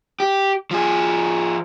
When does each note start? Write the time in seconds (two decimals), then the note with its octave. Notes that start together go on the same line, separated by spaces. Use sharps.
0.20 G4
0.71 F3 G#4